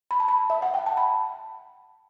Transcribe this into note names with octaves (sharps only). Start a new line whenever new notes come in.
B5
A5
B5
E5
F#5
G5
A5
B5